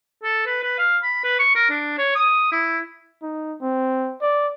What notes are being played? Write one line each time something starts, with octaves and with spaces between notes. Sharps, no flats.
A4
B4
B4
F5
B5
B4
C#6
A#4
D4
C#5
D#6
E4
D#4
C4
D5